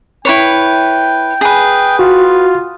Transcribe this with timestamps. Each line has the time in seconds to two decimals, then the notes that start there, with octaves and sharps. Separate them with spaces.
0.25 E4 B4 C#5 G5
1.41 G#4 B4
1.99 F4 F#4